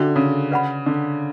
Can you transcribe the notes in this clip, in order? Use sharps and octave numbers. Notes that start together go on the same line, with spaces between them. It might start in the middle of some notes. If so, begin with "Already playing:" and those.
Already playing: D3 C#4 F#4 A4 E5
C#3
B4 D5 F#5 B5
D3